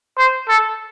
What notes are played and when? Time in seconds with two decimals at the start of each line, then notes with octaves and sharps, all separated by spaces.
0.18 C5
0.48 A4